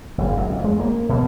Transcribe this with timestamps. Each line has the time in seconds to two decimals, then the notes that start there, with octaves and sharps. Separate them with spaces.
0.18 F#1
0.37 F#2
0.50 F2
0.64 G#3
0.79 A#3
1.09 B2